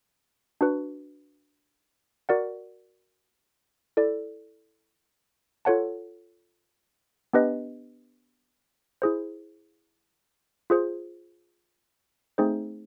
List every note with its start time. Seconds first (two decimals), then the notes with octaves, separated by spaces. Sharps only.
0.61 D4 F#4 B4
2.29 F#4 A#4 D5 F#5
3.97 E4 A4 D5
5.65 F4 A4 C#5 F#5 A5
7.33 B3 D4 G4 B4 D#5
9.02 E4 G#4 C5
10.70 F4 G#4 C5
12.38 A3 C4 D#4 G#4 C5